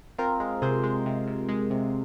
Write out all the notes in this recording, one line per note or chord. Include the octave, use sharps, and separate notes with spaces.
C4 F4 A#4
G#3
C3 G#4 C5
G#3
C3
C3
G#3
C3